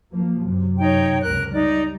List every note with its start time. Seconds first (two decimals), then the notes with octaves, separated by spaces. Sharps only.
0.12 F3 A#3
0.41 F#2 C3
0.79 D#4 C#5 G5
1.23 C#2 C3 A#4 F#6
1.52 G3 D#4 D5